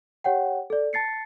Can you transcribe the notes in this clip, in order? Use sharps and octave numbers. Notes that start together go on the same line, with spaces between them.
G4 C#5 F#5 G5
A4 D5
A5 A6 C7 C#7